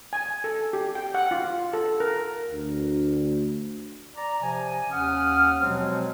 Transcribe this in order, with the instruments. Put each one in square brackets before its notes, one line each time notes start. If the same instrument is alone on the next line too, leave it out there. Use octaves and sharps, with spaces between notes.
[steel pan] G#5
A4
G4
G5
F#5
F4
A4
A#4
[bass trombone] D2
[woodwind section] D5 A#5
C3 F3 G#5
D#2 C#4 F#5 D#6 F6
B2 F3 F#3 G#3 C4